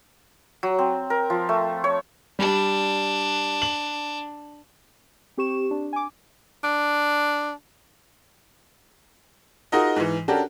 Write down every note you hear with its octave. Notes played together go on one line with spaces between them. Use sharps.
F#3
C4
A#4
F3
A3
C#5
G3 D4
F#7
C4 G4 C#6 E7
D4
G#5 D6
D4
D#4 F4 F#4 G#4 A#4 D#5
G#2 E3
C#4 D4 F#4 G4 A4 A#4